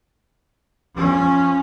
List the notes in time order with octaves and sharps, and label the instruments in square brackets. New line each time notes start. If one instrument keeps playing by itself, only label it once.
[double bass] F3 C#4